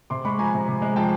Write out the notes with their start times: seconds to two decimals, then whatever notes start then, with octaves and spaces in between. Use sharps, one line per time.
0.10 C3 C6 D6
0.25 G#3 B5 C#6
0.39 F3 G#5 A#5
0.54 C3
0.68 C3
0.82 G#3
0.96 F3 G5 A5